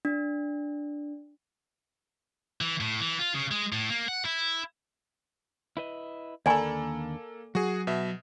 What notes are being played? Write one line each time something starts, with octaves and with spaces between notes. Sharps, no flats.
D4
E3
A2
E3
F4
C#3
G#3
A2
A#3
F#5
E4
E4 B4 D#5
D#2 D3 A#3 A4 D5 G#5 A#5 B5
F#3 F#4 G#4
B2 E5